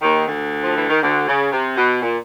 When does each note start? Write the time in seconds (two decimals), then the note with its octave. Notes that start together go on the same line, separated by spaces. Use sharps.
0.01 D#2 D#3
0.26 D2 D3
0.63 F3
0.76 E3
0.88 D#3
1.01 D2 D3
1.26 C#3
1.51 C3
1.76 B2
2.01 A#2